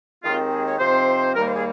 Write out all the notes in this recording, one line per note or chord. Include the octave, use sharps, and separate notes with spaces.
D#2 D#3 G#3 C4 F4
G#4
C#5
C3 F3 C4 D#4 C5
D#2 D#3 G3 A#3 A#4
C5
G#4